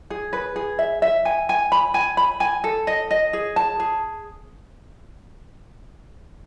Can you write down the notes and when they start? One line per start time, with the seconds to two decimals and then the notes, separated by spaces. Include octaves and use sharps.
0.10 G#4
0.33 B4
0.56 G#4
0.79 E5
1.02 E5
1.25 G#5
1.49 G#5
1.72 B5
1.94 G#5
2.17 B5
2.40 G#5
2.64 A4
2.87 D#5
3.11 D#5
3.33 G#4
3.56 A5
3.80 G#4